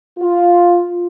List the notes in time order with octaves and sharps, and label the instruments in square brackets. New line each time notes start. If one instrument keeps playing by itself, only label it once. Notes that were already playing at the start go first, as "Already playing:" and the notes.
[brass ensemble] F4